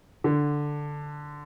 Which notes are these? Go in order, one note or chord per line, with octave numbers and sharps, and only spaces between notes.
D3